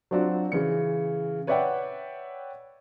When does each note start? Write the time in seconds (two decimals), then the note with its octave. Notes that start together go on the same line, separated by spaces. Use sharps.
0.11 F#3 C4 D4 F4 F#4
0.52 C#3 E3 C#7
1.47 B4 C#5 D5 E5 F#5 G5